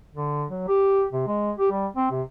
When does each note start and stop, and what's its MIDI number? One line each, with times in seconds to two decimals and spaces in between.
0.14 0.45 50
0.50 0.64 54
0.68 1.05 67
1.12 1.26 48
1.27 1.51 56
1.59 1.71 67
1.71 1.87 55
1.96 2.06 60
2.11 2.22 48